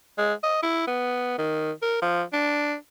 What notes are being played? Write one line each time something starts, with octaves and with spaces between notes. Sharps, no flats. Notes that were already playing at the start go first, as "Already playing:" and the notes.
G#3
D#5
E4
B3
D#3
A#4
F3
D4